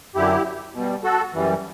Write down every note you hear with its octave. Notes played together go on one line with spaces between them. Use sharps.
F#2 D3 F#3 E4 G4
B2 G3
F#4 A4
F#2 E3 G3